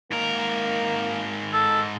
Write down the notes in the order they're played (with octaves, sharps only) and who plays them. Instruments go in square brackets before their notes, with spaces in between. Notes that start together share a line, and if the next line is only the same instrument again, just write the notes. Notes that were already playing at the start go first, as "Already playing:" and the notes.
[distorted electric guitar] G#2 A#4 [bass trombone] A#3
[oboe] A4